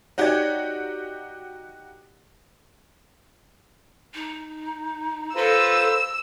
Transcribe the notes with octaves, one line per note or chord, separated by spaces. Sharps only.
D#4 F#4 G4 C#5 D5
D#4
F4 A4 B4 C5 A#5 E6